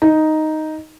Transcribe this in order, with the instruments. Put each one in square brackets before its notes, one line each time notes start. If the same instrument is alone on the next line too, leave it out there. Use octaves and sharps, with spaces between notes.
[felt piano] D#4